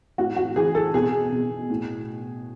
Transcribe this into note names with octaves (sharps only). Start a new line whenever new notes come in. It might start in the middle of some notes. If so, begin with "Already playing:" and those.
A2 F#4
F#4
E3 G#4
A4
B2 G#4
B2
A2